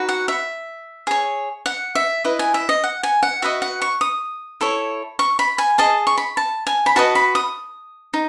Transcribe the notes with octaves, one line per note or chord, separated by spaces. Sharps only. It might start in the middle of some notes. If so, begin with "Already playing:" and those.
Already playing: D#4 F#4 B4
F#5
E5
G#4 C#5
F#5
E5
E4 B4 D#5
G#5
E5
D#5
F#5
G#5
F#5
F#4 B4 D#5 E5
F#5
C#6
D#6
E4 A4 C#5
C#6
B5
G#5
G#4 D#5 A5
C#6
B5
A5
G#5
B5
F#4 B4 D#5 A5
B5
D#6
D#4